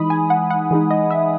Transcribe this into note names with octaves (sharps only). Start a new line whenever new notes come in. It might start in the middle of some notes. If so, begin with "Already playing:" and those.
Already playing: E3 G#3 D#4 B5 D#6
G#5
F#5
F#5
E3 G#3 D#4
D#5
E5